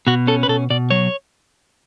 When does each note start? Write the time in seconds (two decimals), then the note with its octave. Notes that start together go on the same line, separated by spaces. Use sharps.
0.07 B2 F#4
0.27 C#4 A4
0.43 B4
0.48 B2 A4
0.70 B2 D5
0.90 F#3 C#5